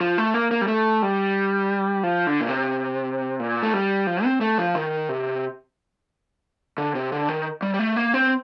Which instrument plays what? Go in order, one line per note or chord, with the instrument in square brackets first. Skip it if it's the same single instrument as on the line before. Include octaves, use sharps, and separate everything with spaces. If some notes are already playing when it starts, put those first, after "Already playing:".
[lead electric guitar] F3
A3
A#3
A#3
G3
A3
G3
F3
D3
A#2
C3
A#2
A3
G3
F3
C4
A3
F3
D#3
C3
D3
C3
D3
D#3
G3
G3
A3
A#3
C4